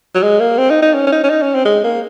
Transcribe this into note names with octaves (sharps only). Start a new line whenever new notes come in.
F#3
G#3
A#3
C4
D#4
D#4
C#4
C#4
D#4
C#4
D#4
C#4
C4
G#3
A#3